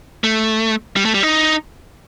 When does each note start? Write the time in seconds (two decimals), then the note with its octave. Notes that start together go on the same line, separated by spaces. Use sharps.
0.24 A3
0.96 G3
1.05 A3
1.14 G3
1.23 D#4